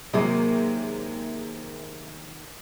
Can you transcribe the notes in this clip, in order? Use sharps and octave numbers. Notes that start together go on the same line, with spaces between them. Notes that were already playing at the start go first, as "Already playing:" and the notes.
C3 D#3 F#3 G#3 A#3 D#5